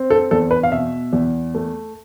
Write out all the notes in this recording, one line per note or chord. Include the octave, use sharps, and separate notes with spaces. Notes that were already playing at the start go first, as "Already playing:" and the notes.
Already playing: C4
A4
E2 A4
B4
F5
B2 E5
E2
A3